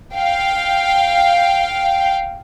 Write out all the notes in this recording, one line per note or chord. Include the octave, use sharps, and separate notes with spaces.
F5 G5